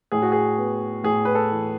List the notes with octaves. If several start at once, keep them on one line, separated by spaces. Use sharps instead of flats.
A2 G#4
F#4
G#4
B3
A2 G#4
B4
A4
E3